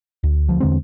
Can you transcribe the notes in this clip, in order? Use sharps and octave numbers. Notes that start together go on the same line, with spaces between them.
D2
D2 F3
E2 D3 G#3 C4